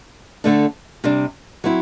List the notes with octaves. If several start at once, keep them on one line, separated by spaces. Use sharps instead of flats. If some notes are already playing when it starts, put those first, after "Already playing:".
D3 A3 D4
C3 G3 D4
F#3 C4 E4